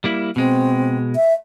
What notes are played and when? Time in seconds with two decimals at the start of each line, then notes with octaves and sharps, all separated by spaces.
0.04 G3 A#3 E4
0.36 B2 G#3 C4
1.16 E5